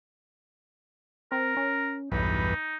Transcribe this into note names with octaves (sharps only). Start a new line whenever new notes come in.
C4 A#4
C#4
B1 E2 G2 D#4 B4